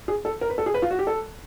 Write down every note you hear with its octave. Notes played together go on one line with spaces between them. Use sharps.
G#4
A4
A#4
B4
A4
G#4
B4
F4
F#4
G4
A4